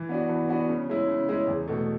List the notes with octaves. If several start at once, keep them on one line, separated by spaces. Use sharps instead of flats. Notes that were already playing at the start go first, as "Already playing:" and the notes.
Already playing: E3
B3 D4 F#4
E3
B3 D4 F#4
C#3
G#3 C#4 E4
C#3
G#3 C#4 E4
E2
B2 A3